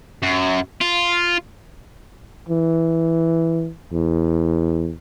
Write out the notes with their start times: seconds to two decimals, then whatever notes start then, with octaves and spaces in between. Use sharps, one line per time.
0.23 F#2
0.81 F4
2.49 E3
3.93 E2